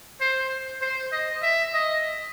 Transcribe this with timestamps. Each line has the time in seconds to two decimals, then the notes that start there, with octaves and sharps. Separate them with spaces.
0.20 C5
0.81 C5
1.12 D#5
1.43 E5
1.74 D#5